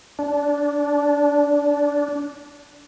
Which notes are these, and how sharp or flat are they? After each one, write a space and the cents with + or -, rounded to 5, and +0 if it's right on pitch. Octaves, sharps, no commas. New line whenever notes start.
D4 -20